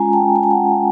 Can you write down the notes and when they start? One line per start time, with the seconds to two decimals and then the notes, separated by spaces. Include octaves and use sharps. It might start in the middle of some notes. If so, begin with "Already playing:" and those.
Already playing: G#3 C#4 F4 G#5 A#5
0.13 G5 A5
0.36 G#5
0.43 A5
0.51 F#5 G#5